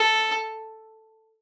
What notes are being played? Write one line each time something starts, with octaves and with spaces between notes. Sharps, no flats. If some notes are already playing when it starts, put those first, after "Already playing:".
Already playing: A4